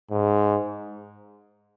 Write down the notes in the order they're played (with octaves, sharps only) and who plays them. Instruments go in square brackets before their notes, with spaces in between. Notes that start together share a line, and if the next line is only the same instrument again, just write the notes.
[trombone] G#2